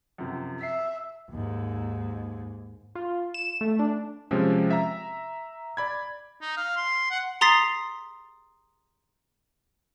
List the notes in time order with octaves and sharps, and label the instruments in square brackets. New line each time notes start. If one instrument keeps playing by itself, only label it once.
[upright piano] F#2 C3 F3
[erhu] E5 [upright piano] B6 C7
[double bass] D#2 G#2
[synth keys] F4
E7
A3
D4
[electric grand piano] C3 F3 G#3 C4 C#4
E5 A#5
D5 B5 G#6
[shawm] D#4
F5
C6
F#5
[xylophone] A#5 C6 D#6 A6 B6 C7